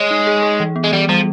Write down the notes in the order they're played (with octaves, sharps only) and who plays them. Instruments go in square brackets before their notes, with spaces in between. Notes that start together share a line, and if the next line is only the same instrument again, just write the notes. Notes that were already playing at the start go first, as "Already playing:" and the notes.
Already playing: [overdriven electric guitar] G#3 [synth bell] C#5
[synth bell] D#4
G#4
G#4
E3
B3
[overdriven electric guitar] G#3
[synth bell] E3 [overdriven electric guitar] G3
[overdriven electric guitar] F3 [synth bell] G3